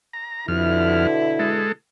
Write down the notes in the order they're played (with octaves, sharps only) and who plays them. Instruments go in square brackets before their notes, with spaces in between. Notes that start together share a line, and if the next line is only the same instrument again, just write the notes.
[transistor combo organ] A#5
[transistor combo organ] F2 F6 [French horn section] B2 D3 E4
[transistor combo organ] G#3 A4